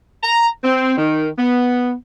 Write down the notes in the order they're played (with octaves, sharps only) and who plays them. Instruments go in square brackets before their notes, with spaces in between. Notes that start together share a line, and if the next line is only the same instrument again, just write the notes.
[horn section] A#5
C4
D#3
B3